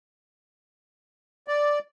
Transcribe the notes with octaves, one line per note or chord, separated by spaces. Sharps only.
D5